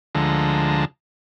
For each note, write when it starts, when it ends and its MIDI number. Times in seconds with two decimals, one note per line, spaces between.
0.15 0.85 38
0.15 0.85 50
0.15 0.85 53
0.15 0.85 56
0.15 0.85 69
0.15 0.85 82